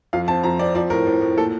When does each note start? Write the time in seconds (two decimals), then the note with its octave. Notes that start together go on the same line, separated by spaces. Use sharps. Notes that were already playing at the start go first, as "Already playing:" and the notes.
0.13 F2 F5
0.28 C4 A5
0.43 F2 A#5
0.59 C4 D5
0.75 F3 D5
0.90 A2 A#4
1.07 A2
1.22 A2
1.37 A#2 A4